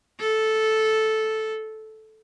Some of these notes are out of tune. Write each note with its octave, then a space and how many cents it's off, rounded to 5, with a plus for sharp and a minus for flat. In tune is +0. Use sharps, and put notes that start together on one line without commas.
A4 -5